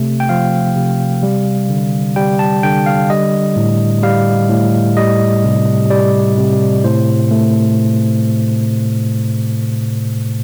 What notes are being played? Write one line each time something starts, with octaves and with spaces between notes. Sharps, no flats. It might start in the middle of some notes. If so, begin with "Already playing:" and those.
Already playing: C3 A3
G5
F3 F5
C3
G3
D3
G3 G5
A5
D3 G5
F5
G3 D#5
A2
G3 F5
A2
G3 D#5
C3
G3 D5
C3
A2 C5
A3